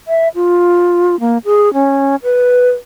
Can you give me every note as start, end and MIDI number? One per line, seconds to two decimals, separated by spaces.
0.08 0.28 76
0.35 1.19 65
1.20 1.38 58
1.45 1.72 68
1.74 2.16 61
2.23 2.69 71